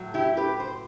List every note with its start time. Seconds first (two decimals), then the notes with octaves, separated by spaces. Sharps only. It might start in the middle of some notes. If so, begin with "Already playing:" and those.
Already playing: A2 F#3
0.14 E4 G4
0.37 G4 B4
0.60 C5